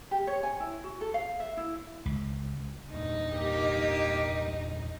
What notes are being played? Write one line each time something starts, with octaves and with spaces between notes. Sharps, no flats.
G4
C#5
G#5
E4
F#4
A4
F5
E5
E4
C#2
E2 G2 A#2 D#4
A#3 G4